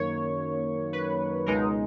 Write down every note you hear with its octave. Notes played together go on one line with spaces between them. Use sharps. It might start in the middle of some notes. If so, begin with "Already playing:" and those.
Already playing: F#2 D#3 A#3 C#5
B4
C#2 B2 G#3 D#4 A#4